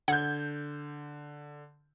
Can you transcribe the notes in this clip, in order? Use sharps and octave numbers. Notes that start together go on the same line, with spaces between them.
D3 F#5 G6 G#6